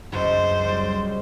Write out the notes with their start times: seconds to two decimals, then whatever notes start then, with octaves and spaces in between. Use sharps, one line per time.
0.12 C#2 F#2 C5
0.65 G3 G4